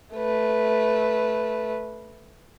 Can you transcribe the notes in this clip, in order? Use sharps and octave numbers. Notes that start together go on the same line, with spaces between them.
A3 B4